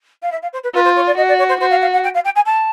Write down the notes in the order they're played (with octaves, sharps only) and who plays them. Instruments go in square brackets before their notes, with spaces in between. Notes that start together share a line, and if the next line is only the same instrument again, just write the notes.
[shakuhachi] F5
E5
F5
C5
B4
[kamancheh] F4 [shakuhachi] B4
[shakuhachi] C5
C#5
D5
[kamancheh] F#4 [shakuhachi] D#5
[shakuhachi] D5
C#5
C5
[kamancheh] F#4 [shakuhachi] C5
[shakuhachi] F5
F5
F#5
G5
F5
G5
G#5
A5